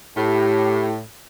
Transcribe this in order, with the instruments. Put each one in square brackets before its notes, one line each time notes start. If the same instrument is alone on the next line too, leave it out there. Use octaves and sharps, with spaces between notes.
[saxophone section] A2 [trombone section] G4